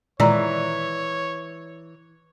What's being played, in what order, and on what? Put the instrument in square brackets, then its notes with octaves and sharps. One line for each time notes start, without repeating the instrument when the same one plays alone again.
[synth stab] A#2 D#3 G#3 [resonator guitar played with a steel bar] E3 [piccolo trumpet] C#5 [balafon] D5 A#5